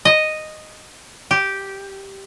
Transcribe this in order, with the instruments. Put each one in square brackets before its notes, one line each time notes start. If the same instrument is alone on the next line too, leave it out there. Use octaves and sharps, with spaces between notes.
[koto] D#5
G4